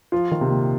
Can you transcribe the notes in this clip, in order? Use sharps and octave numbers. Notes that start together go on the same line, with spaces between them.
F3 F4
D#3
C3
A#2